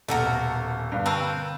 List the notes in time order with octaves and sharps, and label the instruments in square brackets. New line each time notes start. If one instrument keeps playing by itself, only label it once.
[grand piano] D#1 A4 C#7 [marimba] B2 B3 [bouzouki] A3 F#4 A#4
[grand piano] G2 B3 [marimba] D3 G3 F5
[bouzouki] C4 A#4 B4 [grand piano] A5 C#6 E6